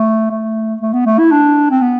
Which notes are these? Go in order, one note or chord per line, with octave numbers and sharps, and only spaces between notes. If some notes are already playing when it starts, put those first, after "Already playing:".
Already playing: A3
A3
A3
B3
A3
E4
D4
C4
B3